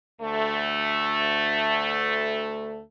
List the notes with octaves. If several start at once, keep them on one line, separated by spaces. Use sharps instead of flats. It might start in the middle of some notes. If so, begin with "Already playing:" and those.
D2 A3